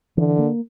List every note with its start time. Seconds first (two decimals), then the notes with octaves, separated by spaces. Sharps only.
0.17 D3 E3
0.39 A#3